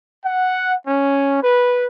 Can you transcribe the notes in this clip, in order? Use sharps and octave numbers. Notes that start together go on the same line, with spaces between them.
F#5
C#4
B4